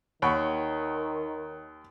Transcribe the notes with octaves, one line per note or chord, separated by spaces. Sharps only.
D#2 D#3 C#5 F#5 B5 C#6